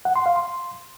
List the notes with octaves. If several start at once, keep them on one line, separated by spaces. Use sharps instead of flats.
F#5
C6
F5
C6